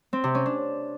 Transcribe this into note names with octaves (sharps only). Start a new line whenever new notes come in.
C4
C3
C#4
D4